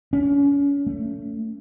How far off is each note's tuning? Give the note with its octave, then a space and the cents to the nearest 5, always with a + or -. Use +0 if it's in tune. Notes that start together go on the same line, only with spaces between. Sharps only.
C#4 +35
A3 +20